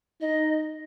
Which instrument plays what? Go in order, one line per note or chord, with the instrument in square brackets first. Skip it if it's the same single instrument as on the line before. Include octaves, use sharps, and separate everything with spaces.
[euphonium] D#4 [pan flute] D#5